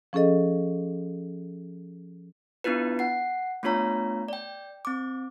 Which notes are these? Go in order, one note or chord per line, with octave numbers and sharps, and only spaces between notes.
F3 C#4 G#4 A4 D#5
B3 D4 E4 F4 B4
F#5 C7
A3 B3 D4 F4 C#5 A#5
D5 G5
C4 D6